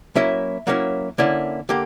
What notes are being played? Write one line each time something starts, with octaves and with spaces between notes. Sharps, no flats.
F#3 A#3 C#4 E4 E5
F#3 A#3 C#4 E4
D3 A#3 C#4 E4
D3 A#3 G4